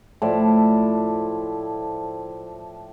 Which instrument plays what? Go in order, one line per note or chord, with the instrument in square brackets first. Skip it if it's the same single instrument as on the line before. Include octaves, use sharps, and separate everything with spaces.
[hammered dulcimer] A2 F3 A4 D5